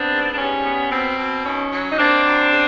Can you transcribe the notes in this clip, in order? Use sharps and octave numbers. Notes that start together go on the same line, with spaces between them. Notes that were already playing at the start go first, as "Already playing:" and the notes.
Already playing: B3 C4 D4
G#2
D4
G3 C#4
B3
B2 C4
B2
D#3 C#4
F#3
D#4
A#3 C4 D4
F#2
C#3